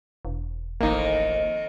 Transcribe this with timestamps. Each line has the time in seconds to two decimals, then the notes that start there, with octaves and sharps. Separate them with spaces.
0.25 E1
0.81 A1 F2 D#3 A#3 D#4